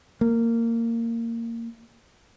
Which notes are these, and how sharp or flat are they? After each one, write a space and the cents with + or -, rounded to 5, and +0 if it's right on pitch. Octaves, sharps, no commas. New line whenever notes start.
A#3 -15